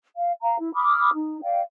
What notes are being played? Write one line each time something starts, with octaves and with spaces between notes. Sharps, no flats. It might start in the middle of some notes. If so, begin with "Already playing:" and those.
F5
F5 A#5
E4
B5 D6 D#6 F6
D#4
D5 F5 G5